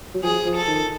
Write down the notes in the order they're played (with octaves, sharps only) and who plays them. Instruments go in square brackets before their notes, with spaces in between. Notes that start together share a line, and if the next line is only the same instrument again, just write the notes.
[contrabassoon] F#3
[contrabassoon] F3 [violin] G#4
[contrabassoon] F3
[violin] A4
[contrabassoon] D#3